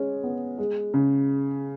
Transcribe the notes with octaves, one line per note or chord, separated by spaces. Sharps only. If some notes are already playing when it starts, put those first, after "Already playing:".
Already playing: G#3 C#4
B3
G#3
C#3